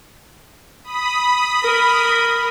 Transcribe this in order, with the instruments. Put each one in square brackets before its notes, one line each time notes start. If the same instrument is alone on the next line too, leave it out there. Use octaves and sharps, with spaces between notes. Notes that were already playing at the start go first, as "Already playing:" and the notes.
[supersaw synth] B5 D#6
[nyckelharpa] A#4